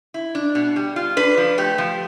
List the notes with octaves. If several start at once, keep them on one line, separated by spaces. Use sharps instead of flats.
E4
D4
B2
G3
F4
D4 B4
F3
A3 G4
F3